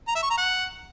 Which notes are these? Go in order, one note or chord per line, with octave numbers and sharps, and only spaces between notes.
A#5
E5
C#6
A#5
F#5